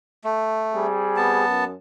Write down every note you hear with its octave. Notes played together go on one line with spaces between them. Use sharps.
A3
G3 C4 G#4
B3 A5
F#2